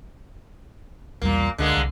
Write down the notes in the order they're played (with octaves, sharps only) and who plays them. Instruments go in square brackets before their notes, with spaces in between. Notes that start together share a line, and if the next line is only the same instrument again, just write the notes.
[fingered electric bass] B1 E2 G3 [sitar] A#2 A#3
[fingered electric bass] C#2 [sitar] D3 G#3 A#3
[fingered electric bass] C2